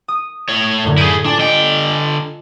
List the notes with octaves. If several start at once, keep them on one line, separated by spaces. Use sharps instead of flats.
D#6
A2 C#5
F#2 A2 D3
E4 G#4 G6 D#7
D4 F4 G#5 D6
D3 D#5 G5 C#7